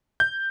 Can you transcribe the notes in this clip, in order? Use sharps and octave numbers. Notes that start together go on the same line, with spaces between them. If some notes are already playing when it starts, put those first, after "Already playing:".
G6